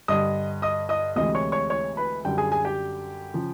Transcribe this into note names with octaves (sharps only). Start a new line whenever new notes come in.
G2 D3 G3 D#5 D#6
D#5 D#6
D#5 D#6
D2 C3 E3 G#3 D#5 D#6
C#5 C#6
C#5 C#6
C#5 C#6
B4 B5
F#2 D3 G3 G4 G5
G#4 G#5
G#4 G#5
G4 G5
C#3 F3